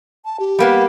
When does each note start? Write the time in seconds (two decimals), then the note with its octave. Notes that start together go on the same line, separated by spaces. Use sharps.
0.25 A5
0.40 G4
0.59 G3 A#3 B3